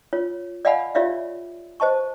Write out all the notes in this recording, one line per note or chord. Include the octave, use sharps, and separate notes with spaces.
F4 C#5
D5 D#5 F5 F#5 G#5 B5
F4 G4 C#5 D5 E5 F5
C5 D#5 A5 C#6